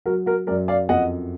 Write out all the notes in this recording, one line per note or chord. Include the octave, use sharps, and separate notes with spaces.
F#3 F#4 A#4
F#4 A#4
F#2 A#4 D5
D5 F5
F2 D#5 F#5